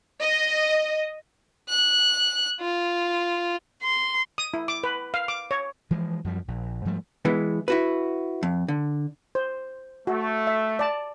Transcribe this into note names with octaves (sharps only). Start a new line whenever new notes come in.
D#5
F#6
F4
C6
D#6
E4
D6
B4
F5
D6
C#5
E3 F3 G#3
F#2 F3 G3
A#1
G#2 F3 G3 A3
E3 G#3 B3
E4 F#4 B4
F2
D3
C5
A3 F#4
E5
D5 A5